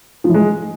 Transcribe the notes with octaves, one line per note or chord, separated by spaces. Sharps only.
F3
E3
G#3